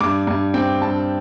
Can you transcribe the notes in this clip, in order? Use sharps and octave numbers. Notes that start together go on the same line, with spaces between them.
G2 D6
G2
C4 G5
G2 A5